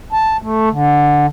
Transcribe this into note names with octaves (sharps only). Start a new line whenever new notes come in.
A5
A3
D3